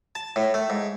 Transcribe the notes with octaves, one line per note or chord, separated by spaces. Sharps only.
A5
A2
A3
G#2